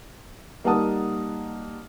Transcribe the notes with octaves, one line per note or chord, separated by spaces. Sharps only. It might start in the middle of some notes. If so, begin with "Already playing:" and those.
G3 A#3 D#4 F#5 A5 D#6